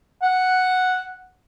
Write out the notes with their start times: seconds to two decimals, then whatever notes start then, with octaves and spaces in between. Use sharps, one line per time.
0.22 F#5